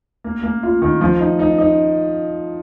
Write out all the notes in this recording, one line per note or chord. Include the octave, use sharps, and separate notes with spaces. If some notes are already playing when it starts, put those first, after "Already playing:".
A#3
A#3
F4
D#3
F3
D#4
D#4
D#4